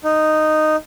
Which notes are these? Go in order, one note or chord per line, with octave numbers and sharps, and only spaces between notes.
D#4